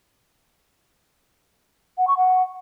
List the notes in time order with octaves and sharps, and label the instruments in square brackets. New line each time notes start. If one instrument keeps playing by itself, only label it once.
[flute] F#5
C#6
F#5